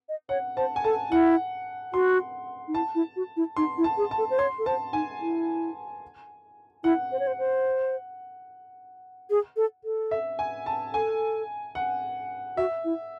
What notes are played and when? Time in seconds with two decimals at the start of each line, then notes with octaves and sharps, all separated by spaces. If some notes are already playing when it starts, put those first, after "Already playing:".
0.09 D#5
0.29 C#5 F#5
0.57 C5 A5
0.76 G#5
0.84 A4 A5
1.11 E4 F#5
1.94 F#4 C6
2.68 D#4
2.75 E4 A5
2.95 E4
3.16 F#4
3.37 E4
3.56 D#4 C6
3.78 E4
3.84 A5
3.97 G#4
4.11 A5
4.18 A4
4.30 C5
4.38 C#5 C6
4.59 A4
4.66 C5 A5
4.93 D#4 G#5
5.21 E4
6.84 E4 F#5
7.12 C5
7.19 C#5
7.27 C5
7.39 C5
9.30 G#4
9.57 A4
9.85 A4
10.11 E5
10.39 G#5
10.66 A5
10.93 A4 G#5
11.75 F#5
12.57 F#4 E5
12.85 E4